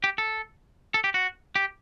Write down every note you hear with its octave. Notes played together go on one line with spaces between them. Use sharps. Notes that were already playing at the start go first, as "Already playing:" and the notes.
G4
A4
A4
G4
F#4
G4